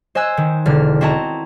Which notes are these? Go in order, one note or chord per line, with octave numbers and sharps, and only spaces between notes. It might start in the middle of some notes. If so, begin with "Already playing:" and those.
C5 D#5 G#5 E6 F#6
D#3
E1 D3 F6
C4 E4 F#4 D#5 A5 A#5